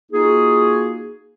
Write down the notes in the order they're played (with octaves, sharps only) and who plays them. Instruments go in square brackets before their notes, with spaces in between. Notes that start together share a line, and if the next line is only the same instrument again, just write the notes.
[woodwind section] A#3 D#4 F4 F#4 G#4